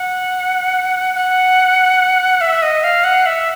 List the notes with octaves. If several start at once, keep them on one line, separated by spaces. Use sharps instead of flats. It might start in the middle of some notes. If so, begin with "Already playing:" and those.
Already playing: F#5
F#5
E5
D#5
F5
F#5
E5